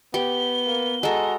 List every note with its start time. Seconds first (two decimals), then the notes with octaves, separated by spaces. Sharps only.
0.14 B3 G4 G7
0.66 A#3
1.03 G#3 F#4 A4 A#5